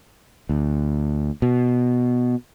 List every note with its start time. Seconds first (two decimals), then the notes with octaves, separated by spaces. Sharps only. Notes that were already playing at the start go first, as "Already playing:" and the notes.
0.49 D2
1.42 B2